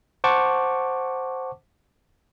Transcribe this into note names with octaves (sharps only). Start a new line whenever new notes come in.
C5 F#5 A5 C#6 D6